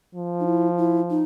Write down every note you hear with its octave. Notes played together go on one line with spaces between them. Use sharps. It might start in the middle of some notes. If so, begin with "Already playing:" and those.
F3
D#4
E4
E4
D#4